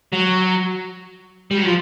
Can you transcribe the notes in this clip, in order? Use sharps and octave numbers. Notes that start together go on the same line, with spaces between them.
F#3
G3
F#3
F3